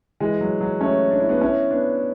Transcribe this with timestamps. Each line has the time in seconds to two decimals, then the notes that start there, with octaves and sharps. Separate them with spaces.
0.20 E3 G#3
0.41 F#3
0.61 F#3
0.81 A3 C#4
1.11 D4
1.20 E4
1.29 B3 D4
1.41 C#4 E4
1.70 B3 D4